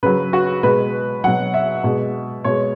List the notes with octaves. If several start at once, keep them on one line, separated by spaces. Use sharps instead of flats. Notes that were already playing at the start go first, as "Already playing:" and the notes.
C#3 F#3 B4
F#4
B2 G#3 B4
B2 F#3 F#5
E5
B2 G#3
B2 G#3 C#5